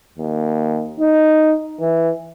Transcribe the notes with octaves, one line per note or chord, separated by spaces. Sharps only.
D#2
D#4
E3